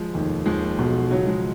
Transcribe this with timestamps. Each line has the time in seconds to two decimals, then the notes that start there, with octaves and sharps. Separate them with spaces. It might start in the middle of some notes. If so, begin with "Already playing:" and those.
Already playing: F3 G#3
0.13 F1 D#2 D#3
0.46 D#2 D#3 F3 G#3
0.78 B1 B2
1.10 C#2 C#3 F3 F#3
1.27 F3 G#3